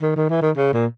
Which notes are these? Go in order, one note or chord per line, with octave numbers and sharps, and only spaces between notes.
D#3
D#3
E3
D#3
C#3
A#2